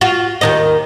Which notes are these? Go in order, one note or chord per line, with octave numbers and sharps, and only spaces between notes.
F4 F#4
D#2 D#3 D#5